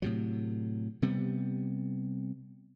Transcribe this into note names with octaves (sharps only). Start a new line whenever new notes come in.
A2 C3 F#3
C3 G3 B3